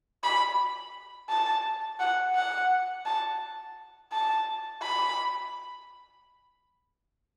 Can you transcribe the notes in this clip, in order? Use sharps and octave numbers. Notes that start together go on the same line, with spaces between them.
B5
A5
F#5
F#5
A5
A5
B5